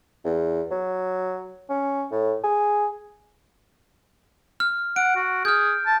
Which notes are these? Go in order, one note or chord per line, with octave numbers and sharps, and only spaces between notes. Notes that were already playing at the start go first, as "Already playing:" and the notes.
E2
F#3
C#4
A2
G#4
F6
F#5 D7
F#4
G#4 F6 G6
A5